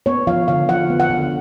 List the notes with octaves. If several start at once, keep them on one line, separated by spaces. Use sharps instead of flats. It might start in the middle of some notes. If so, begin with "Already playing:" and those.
B3 C#5
F3 F5
D3 F5
F3 F#5
B3
F#5
D3